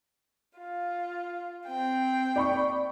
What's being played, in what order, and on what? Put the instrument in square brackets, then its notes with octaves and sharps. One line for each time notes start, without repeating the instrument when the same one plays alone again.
[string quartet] F4
C4 G5
[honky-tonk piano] D5 B5 C#6